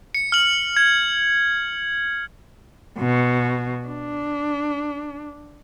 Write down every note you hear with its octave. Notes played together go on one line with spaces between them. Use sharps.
C#7
F6 F#7
G#6
B2
D4